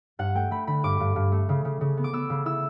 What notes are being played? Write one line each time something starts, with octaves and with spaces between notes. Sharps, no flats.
G2 F#5
A3 G5
A3 B5
D3 B5
G2 D6
G2
G2
A3
C#3
C#3
C#3
B3
D6
B3 E6
C#3
E4 E6